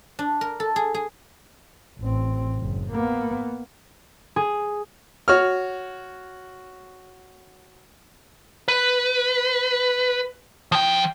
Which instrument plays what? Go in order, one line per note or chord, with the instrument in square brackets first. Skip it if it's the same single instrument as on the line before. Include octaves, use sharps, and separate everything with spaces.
[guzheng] D4
A#4
A4
G#4
G#4
[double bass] A1 C4
F#1
A#3 B3
[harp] G#4
[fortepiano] F#4 C#5 F6
[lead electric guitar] B4
F3 G5